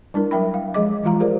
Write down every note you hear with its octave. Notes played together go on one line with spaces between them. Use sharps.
G3 D4 E4 A#4
F#3 A#4 E5 G5 B5
F5
F3 G#3 G#4 D#5 D6
E3 G#3 F4 F5 A#5
G4 G#4 A#4 C5 D5